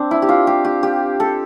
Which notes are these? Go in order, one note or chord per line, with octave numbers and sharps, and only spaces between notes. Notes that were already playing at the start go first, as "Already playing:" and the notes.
Already playing: C4 D4
E4
G4
F4
G4
G4
G4
A4